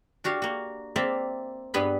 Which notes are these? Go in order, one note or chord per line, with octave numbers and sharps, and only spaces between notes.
D4 F#4 G4 F5
A#3 F#4
A#3 C4 D5 E5
G2 G3 B3 G#5 B5